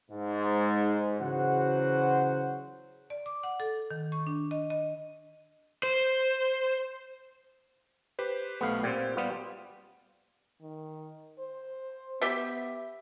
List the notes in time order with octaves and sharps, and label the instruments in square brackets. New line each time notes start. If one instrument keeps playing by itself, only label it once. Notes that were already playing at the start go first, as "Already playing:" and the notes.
[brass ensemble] G#2
C#3 E3 F#3 F#4 C5 F#5
[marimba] D5
D6
F#5
A4
D#3
C#6
D4
D#5
D#5
[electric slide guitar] C5
[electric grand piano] G4 B4 C5
[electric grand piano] B1 A3 [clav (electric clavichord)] B3 F5
[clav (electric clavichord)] A#2 C4 [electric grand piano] G4 G5
[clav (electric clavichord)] G3 B3 F4
[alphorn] D#3
C5
[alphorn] B3 [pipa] G4 E5